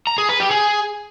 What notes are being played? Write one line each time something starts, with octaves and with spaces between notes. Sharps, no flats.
A#5
G#4
B4
G4
G#4